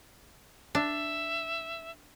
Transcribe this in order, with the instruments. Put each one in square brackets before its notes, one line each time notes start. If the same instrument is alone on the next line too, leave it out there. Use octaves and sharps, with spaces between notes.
[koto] D4 [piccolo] E5